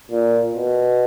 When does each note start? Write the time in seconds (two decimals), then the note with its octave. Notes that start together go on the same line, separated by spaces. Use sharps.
0.11 A#2
0.53 B2